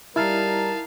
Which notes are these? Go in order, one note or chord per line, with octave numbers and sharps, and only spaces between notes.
G3 D#4 E4 A#4 F5 A5 F6